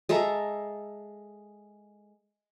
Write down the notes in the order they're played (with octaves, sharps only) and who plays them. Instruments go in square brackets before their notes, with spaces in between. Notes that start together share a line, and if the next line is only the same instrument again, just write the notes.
[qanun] G#3 A4 E5 A#5